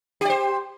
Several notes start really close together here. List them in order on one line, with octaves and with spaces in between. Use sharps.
G4 D5 C5